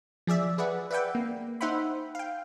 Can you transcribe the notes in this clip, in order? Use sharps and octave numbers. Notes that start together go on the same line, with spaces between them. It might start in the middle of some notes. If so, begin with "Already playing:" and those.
F3 G#4 D5 E5
G#4 B4 D5 E5 F#5
B4 D5 E5 F#5 G5
A#3
D#4 C5 E5 F#5 G5 B5
F5 G5